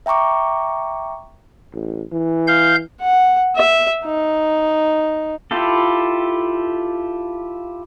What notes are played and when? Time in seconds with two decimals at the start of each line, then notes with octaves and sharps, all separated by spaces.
0.06 E5 G5 A#5 C#6 D6
1.73 A1
2.12 E3
2.48 F5 G6
3.01 F#5
3.56 E5
4.05 D#4
5.51 E4 F4 G4 A4